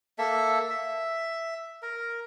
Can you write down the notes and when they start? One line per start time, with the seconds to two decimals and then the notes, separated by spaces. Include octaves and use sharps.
0.18 A#3 A4 E5
0.70 E5
1.82 A#4